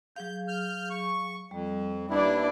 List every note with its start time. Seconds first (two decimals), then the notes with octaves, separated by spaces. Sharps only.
0.16 F#3 G#4 F5 G6
0.48 F6 G6
0.90 C#6
1.51 F2 G3
2.10 D#2 B3 D4 E4 D5